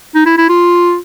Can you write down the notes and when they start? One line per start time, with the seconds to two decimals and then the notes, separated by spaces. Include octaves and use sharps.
0.15 D#4
0.26 E4
0.38 E4
0.49 F4